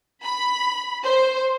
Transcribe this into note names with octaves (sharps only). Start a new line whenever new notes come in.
B5
C5